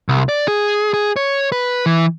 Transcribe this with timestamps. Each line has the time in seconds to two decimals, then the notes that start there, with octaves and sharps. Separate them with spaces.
0.09 C2
0.29 D5
0.48 G#4
0.94 G#4
1.16 C#5
1.52 B4
1.86 E3